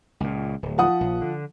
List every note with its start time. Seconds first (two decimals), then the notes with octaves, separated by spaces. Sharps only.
0.20 C#2 A#2
0.63 D1
0.78 F3 F#5 D#6
1.00 A#1
1.21 D3